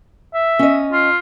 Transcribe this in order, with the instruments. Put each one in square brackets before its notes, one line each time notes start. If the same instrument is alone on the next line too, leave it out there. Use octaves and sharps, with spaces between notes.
[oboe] E5
[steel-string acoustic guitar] C#4 D#5
[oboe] F4